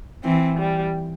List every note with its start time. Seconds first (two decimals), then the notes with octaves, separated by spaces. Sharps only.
0.24 E3 C4
0.58 G3